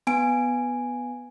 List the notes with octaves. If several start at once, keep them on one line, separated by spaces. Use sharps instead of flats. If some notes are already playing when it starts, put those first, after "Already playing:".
B3 G#5 D7